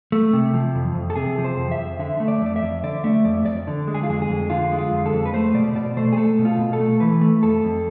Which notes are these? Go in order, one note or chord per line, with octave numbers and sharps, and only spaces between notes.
A3
C3
F3
F2
F2
A4
C3 G#4
F3
C5
F2
E5
F2
D3 E5
A3
D5
F2
D5
E5
F2
D3 D5
A3 E5
F2 D5
F2 D5
D3
G#3
G#4
F4
F2 G#4
G#4
F2
D3 F4
G#3
F4
F2
A4
F2
B4
A3 C5
B2 D5
B2 D5
A3 C5
G#4
A3 A4
B2
F4
B2
A4
A3
E3 B4
A3
F2 A4
F2